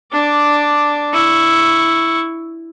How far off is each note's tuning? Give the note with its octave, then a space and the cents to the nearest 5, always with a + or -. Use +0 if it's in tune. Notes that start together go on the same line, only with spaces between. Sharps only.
D4 +0 D6 +0
E4 +0 C#6 +0